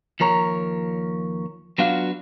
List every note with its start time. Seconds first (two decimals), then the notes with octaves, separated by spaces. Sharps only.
0.20 D#2 F3 A#4 C#5 A#5
1.78 F#3 B3 D4 F4 F#4 F5